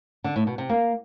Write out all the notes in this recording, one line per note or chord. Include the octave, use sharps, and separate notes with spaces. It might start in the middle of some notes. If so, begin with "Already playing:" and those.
D3
A2
B2
C3
A#3